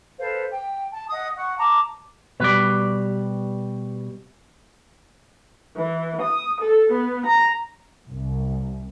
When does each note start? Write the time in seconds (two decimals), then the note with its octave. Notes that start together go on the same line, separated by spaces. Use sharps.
0.18 A4 B4 C5 F5
0.51 G5
0.91 A5
1.10 D#5 F#5 D#6
1.36 F#5 C#6
1.57 A5 A#5 D6
2.40 B2 G3 B4 D5
5.75 E3
6.20 D#6
6.58 A4
6.89 B3
7.24 A#5
8.10 C2